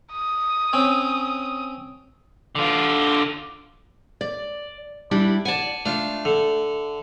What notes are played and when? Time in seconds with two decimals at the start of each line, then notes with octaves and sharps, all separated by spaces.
0.13 D#6
0.73 C4 C#4
2.55 D3 F4
4.21 D5
5.11 G3 D4 E4
5.45 D5 F#5 G#5 A5
5.85 A3 D4 F4
6.25 D3